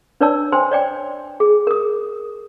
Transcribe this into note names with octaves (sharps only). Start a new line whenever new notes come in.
D4 B4 C#5 D5 A5 E6
C5 G5 G#5 C6
C#5 D5 G5
G#4
A#4 D#6